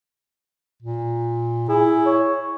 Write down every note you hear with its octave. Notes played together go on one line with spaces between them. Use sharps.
A#2
E4 G#4
C#5